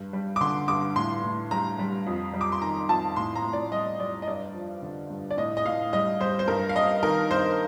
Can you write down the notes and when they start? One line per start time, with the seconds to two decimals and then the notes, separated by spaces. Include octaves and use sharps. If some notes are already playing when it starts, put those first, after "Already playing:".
Already playing: G2
0.13 G3
0.36 D6
0.41 D3 C6
0.68 G2 D6
0.96 A2 C6
1.23 A2
1.51 G3 A#5
1.79 G3
2.07 F2
2.34 G3
2.41 D6
2.52 C6
2.61 D#3 A#5
2.89 F2 A5
3.16 A2 C6
3.35 A#5
3.44 A2
3.53 D5
3.72 G3 D#5
4.00 G3 D5
4.22 D#5
4.27 G2 D5
4.54 F3
4.82 D3
5.10 G2
5.31 D5
5.37 A2 D#5
5.57 D#5
5.65 A2 F5
5.93 G3 D#5
6.20 G3 C5
6.39 C5
6.48 G2 A#4
6.69 F5
6.75 G3 D#5
7.03 D#3 A#4
7.31 G2 C5